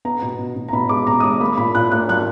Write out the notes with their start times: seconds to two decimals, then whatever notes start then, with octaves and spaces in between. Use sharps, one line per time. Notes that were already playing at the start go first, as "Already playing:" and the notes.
0.05 B3 A#5
0.22 B2
0.38 B2
0.56 B2
0.69 A#5
0.73 B2 B5
0.89 G#3 D6
1.07 B2 A#5
1.20 D#6
1.23 G#3 D6
1.40 A#3 B5
1.58 A#2 B5
1.75 A#2 F#6
1.92 A#3 F#6
2.09 F#3 F#6